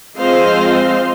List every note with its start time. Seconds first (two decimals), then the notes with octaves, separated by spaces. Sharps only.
0.16 F3 G#3 C4 C5 D#5 F5